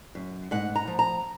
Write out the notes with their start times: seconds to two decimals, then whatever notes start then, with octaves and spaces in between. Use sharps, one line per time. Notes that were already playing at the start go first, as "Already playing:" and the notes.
0.15 F#2
0.51 G#2 F#5
0.76 A#5
0.87 F3
0.99 A#5